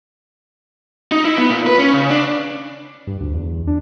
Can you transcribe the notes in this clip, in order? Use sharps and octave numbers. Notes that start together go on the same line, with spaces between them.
D#4
E4
B3
A#2
B4
C#4
C#3
D4
G2
D2
E2
D4